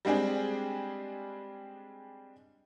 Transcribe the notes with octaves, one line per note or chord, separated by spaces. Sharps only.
G3 G#3 C4 D4 G#4